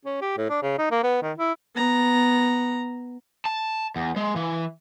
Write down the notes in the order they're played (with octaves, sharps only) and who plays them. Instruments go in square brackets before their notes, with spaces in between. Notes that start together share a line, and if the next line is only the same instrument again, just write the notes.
[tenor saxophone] C#4
G4
A2
D4
C#3
D#4
A#3
B3
D#3
E4
[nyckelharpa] B3 A#5
[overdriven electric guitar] A5
E2
G#3
E3